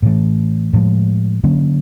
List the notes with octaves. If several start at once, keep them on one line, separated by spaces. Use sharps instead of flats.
A2 E3 A3
A2 F3 G#3
D3 F#3 A#3 C#4